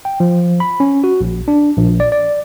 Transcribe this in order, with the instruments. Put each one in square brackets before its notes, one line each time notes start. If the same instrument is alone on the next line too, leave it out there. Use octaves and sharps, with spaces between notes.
[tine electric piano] G5
F3
B5
C#4
F#4
A#1
D4
A#1
D5
D5